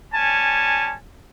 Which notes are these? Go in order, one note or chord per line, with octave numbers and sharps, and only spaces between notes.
G3 C#4 G#5 A5